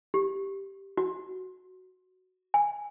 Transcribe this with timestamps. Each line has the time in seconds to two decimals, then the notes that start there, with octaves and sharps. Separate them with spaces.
0.14 G4
0.97 F#4
2.54 G#5